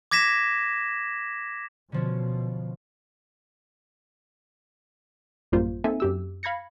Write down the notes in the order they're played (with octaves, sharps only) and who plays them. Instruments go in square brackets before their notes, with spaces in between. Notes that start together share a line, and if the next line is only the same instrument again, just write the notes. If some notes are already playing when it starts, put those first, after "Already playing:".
[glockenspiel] D6 G#6 A#6 B6 E7
[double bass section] B2 [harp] D3 F3 C#4
[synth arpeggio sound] A1 F#2 G3 A#3 F4 C5
A#3 C4 D#4 A4 E5 G#5
F#2 G4 E6
F5 B5 G#6 A#6 C#7